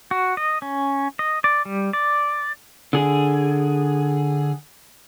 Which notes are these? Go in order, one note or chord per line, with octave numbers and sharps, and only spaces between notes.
F#4
D#5
C#4
D#5
D5
G3
D5
D3 G#4